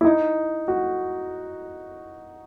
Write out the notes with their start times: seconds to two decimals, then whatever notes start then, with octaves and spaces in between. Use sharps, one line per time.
0.01 E4
0.05 D#4
0.68 F#4